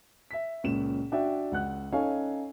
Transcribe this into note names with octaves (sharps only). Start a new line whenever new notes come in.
E5 B6
C#2 A#2 C#4 E7
D4 F#4 D5 E5 G5
C#2 F#5 F#6
C#4 D#4 A4 C#5 F5 G#5